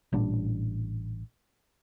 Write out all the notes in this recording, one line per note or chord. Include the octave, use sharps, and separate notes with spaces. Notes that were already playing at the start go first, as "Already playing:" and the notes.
A1 A#2 G3 D4